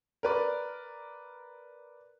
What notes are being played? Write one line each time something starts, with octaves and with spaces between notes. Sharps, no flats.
A#4 B4 D5